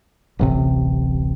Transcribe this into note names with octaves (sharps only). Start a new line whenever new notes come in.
D1 A1 C3